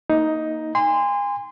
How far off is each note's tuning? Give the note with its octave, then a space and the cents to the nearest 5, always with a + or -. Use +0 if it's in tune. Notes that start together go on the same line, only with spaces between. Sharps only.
A#3 +0 D#4 +10
G#5 -35 C6 -20